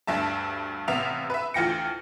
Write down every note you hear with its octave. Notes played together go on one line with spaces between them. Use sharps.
D2 G2 E5 A5
A1 C3 B3 E5 F5 F7
B4 E5
D2 E3 F4 G5 A#6 C#7